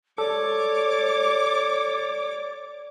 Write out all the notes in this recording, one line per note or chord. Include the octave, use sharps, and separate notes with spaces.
A4 C#5 D5 D6